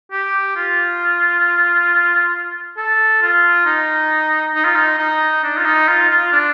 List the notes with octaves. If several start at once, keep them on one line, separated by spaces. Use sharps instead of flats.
G4
F4
A4
F4
D#4
D#4
F4
D#4
D#4
D4
F4
D#4
F4
F4
D4